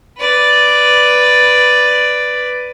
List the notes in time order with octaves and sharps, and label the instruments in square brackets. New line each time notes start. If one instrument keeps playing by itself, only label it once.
[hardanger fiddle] B4 D5